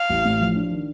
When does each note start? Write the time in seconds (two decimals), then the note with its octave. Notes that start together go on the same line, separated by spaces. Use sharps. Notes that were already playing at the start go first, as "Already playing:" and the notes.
Already playing: F5
0.10 A1
0.25 A2
0.41 F3
0.56 D4
0.71 D#3